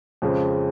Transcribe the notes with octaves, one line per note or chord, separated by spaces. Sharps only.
F2 C#3 F3 G#3